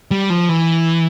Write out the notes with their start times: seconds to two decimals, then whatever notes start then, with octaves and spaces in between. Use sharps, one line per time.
0.11 G3
0.30 F3
0.49 E3